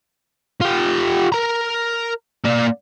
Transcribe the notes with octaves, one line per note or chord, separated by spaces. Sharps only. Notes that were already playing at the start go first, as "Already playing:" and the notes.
F4 G4
A#4 A#5
A#3 D5